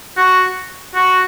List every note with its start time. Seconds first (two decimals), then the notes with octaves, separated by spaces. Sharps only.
0.17 F#4
0.94 F#4